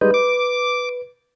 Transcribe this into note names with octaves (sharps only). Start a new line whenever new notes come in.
G3 G#3 D#4 B4
D6